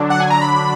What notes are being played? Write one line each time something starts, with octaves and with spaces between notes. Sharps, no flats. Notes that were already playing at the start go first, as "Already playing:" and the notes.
Already playing: D3 F#3 D4
F#5
G#5
A#5
B5